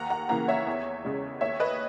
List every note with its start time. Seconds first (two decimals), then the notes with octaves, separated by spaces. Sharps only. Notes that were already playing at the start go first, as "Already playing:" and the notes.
Already playing: D#2 F#5 A#5
0.10 F#5 A#5
0.29 C#3 E3 A#3 F#5 A#5
0.48 C#5 E5
0.67 E2
1.05 C#3 G#3
1.41 D#2 C#5 E5
1.60 B4 D#5